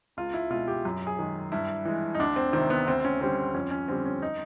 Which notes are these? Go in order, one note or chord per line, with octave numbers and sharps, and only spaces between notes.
C#2 F4
E4
B2 G#3 F4
G4
F#2
G#4
D#3 G#3
G2 E4
E3 G#3
D#4
D2 D4
C4
C3 D#3 C4
B3
D2 C4
C#4
D3 G3 C4
F2 C#4
C#4
D3 G3 C4
C#4
D#4